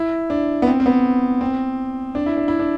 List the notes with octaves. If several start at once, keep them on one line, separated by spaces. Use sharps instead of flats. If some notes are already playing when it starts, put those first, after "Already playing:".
Already playing: E4
D4
B3
C4
C4
B3
C4
D4
E4
D4
E4
D4